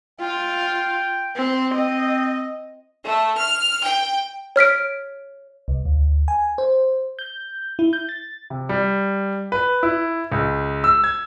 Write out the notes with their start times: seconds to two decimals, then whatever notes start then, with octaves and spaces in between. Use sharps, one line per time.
0.20 F4 G5
1.36 C4
1.74 C4 D#5
3.05 A3
3.38 F6
3.83 G5
4.56 C#5 F6 B6 D7
5.68 C2
5.85 D2
6.28 G#5
6.58 C5
7.19 G6
7.79 E4
7.93 G6
8.09 A6
8.50 C3
8.69 G3
9.52 B4
9.83 E4
10.32 C#2
10.84 E6
11.04 G#6